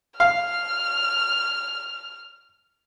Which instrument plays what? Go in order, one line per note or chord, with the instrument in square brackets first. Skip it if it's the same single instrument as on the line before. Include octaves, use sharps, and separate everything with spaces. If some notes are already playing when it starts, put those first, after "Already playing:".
[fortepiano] F5 [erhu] F6